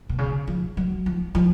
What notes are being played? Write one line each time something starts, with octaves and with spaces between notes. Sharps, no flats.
B2
C#3
F3
F#3
F3
F3